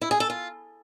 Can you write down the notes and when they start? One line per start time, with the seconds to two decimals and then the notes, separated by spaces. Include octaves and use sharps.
0.01 E4
0.11 G#4
0.20 A4
0.30 F4